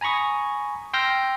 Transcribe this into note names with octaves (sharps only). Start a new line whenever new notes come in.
G#5 A#5 B5 C#6 D#6
G5 C6 E6 F6 G6 A#6